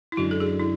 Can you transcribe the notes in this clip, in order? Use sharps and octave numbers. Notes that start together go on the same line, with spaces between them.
E4
F#2 D3 G#3 F#4
A4
G#4
E4